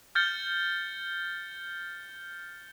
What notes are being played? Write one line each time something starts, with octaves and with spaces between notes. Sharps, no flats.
F6 G6 A6 C#7 G7